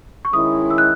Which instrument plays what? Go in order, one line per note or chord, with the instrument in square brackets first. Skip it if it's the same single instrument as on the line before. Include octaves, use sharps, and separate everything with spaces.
[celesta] C#6
[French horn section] D#3 G#3 C#4 E4 [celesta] D#6
[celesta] E6
F#6